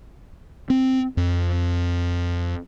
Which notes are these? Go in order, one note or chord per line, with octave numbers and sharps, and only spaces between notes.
C4
F2